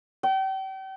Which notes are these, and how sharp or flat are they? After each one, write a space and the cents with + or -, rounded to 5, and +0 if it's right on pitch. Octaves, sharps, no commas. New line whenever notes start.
G5 -35